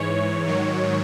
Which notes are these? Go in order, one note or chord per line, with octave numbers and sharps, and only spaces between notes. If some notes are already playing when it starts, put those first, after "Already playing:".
Already playing: G#2 E3 C#5
G#2 D#3 F#3